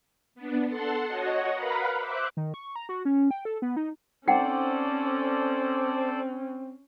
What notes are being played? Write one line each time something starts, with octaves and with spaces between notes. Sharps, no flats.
B3 D4
A4 F#5 A5 C6
F#4 C#5 D#5 F#5
A#4 B4 F5 F#5 A#5 B5
C5 E5 D6 F#6
D#3
C#6
A#5
F#4
C#4
G5
A4
B3
D#4
C4 C#4 D#4 A4 C5 D5 F#5 G5